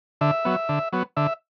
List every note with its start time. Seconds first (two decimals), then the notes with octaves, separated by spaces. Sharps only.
0.21 D3 E5
0.45 F#3 B3
0.69 D3
0.93 F#3 B3
1.17 D3 E5